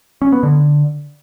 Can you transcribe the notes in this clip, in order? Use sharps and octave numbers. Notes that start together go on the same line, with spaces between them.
C#4
B3
D3